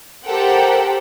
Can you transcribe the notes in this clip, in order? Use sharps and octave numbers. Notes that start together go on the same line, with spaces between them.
G4 A4 A#4 C5 F#5 G5